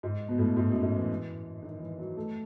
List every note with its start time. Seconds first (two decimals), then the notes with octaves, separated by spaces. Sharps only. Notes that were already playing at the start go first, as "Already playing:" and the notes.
0.03 G#2
0.28 B2
0.38 A2
0.57 G#2
0.70 F#2
0.82 G#2
0.96 E3
1.63 D#3
1.80 E3
1.98 F#3
2.16 A3